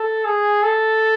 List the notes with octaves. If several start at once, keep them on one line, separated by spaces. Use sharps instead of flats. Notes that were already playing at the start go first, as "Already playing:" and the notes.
Already playing: A4
G#4
A4